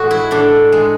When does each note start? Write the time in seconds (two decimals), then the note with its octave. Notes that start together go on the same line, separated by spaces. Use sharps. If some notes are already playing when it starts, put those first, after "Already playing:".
Already playing: A2 G#3 F#4
0.11 E4
0.31 A2 D4
0.72 G#3